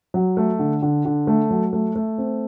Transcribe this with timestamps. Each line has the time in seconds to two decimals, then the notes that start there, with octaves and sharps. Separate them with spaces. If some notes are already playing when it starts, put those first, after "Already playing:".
0.14 F#3
0.37 A3
0.59 D3
0.82 D3
1.05 D3
1.27 A3
1.51 F#3
1.73 A3
1.96 A3
2.18 C4